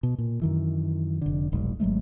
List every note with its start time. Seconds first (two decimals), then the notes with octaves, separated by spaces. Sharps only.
0.03 B2
0.18 A#2
0.42 F#2 D#3 E3
1.21 F1 D3
1.52 F1 B1 G#2
1.80 G#1 F#3 G#3 A3